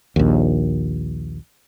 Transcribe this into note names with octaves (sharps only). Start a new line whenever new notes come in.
A#1 D#2